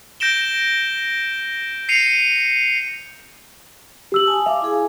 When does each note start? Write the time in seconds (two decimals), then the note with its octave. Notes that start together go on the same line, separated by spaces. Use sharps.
0.20 G6 A#6 D7 E7 G7
1.89 C7 C#7 D#7 F7
4.12 G4 E6 F#7
4.26 G#5 A5 D#6
4.46 E5 F5 D6
4.62 E4 G#4 G#5